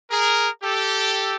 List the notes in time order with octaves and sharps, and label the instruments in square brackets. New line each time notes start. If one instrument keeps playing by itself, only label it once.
[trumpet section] G#4 A#4
G4 A4